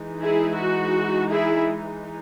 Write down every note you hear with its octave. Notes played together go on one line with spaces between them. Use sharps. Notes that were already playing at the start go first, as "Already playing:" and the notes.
Already playing: E3 G#3 D#4
E4 G#4
F#4
E4 G#4